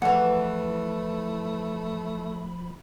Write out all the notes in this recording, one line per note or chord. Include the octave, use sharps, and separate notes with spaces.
E2 E3 F3 A3 F#5 B5